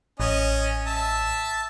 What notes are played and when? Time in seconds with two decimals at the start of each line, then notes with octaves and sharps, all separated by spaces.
0.20 A1 C#4 D#5
0.87 E5 A5